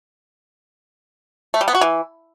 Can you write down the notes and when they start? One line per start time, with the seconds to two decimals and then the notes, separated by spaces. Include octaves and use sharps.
1.54 A3
1.61 G3
1.68 B3
1.75 F#4
1.81 E3